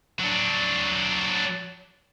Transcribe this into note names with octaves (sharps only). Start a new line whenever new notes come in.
F#3 D4